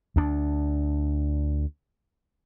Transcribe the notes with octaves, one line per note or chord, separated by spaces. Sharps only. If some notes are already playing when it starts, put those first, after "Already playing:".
D2 D4